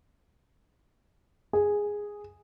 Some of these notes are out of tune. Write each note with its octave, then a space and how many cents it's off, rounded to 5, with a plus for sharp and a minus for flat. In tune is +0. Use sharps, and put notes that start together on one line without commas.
G#4 -5